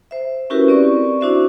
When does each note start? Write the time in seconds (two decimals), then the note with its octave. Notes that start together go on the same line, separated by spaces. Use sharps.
0.11 C5 E5
0.50 C#4 E4 F#4 G4 A#4 B4
0.68 C4 D5 C#6
1.21 D4 E4 F#4 C5 E5